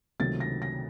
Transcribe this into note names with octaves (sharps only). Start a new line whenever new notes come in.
C#2 C3 D#3 F#3 A3 A6
A#6
A#6